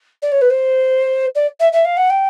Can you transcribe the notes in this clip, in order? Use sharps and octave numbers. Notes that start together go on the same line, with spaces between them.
D5
C#5
B4
C5
D5
E5
E5
F5
F#5
G5